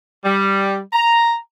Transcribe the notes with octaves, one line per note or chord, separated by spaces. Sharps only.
G3
A#5